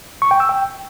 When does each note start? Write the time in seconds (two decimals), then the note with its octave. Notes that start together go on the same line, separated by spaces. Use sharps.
0.22 C#6
0.31 G5
0.40 E6
0.49 G5